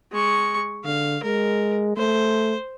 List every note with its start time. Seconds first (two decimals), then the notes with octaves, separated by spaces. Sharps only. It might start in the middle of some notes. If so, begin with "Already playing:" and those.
0.12 G#3 C#6
0.85 D3 F5
1.24 G#3 A#4
1.97 A3 C5